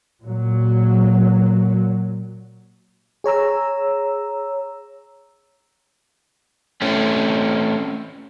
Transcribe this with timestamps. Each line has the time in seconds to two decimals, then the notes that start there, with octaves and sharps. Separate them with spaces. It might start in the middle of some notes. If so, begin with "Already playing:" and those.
0.23 A#2 F#3
3.24 G#4 C#5 A#5 E6
6.82 A3 C4 C#4